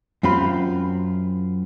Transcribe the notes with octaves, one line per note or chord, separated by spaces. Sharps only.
F#2 C4 F4 B5